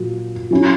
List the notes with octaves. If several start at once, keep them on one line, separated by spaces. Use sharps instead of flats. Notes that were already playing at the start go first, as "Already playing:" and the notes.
Already playing: A#2 F#3
F#3 C#4 E4